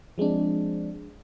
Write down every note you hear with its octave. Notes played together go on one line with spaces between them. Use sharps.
F3 G#3 C4 D4